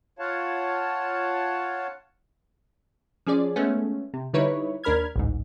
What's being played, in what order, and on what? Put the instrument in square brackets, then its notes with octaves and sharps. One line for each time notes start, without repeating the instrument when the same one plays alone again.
[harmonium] F4 C#5 F5 F#5 A5
[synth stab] F3 C#4 G#4 D5
G#3 A3 B3 C#4
C3
D3 G3 D#4 E4 B4 C#5
D#2 D4 A#4 B5 F6 G#6
A1 D2 G#2